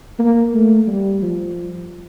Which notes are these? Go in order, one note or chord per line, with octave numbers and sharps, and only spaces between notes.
A#3
A3
G3
F3